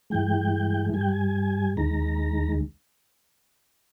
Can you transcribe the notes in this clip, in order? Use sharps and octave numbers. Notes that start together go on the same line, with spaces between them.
G2 E3 G#3 G5
G2 G3 G#5
G5
G#5
D#2 D#3 G#3 A#5